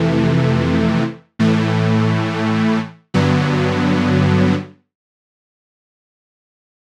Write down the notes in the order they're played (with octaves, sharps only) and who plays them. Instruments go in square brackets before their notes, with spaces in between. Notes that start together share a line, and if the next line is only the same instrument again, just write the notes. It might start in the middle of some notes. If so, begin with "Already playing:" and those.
Already playing: [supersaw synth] F2 C3 E3 A3
A2 E3 A3
G2 D3 F#3 B3